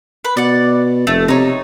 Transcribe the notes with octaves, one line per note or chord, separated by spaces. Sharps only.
B4
B2 D5 F#5
F1 A3
C3 D#4 C#5